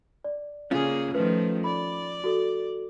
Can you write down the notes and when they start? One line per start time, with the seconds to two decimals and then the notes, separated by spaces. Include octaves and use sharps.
0.24 D5
0.71 C#3 A#3 C#4 F4 G#4
1.15 D#3 F3 A3 B4
1.64 D5 B5
2.24 F#4 A4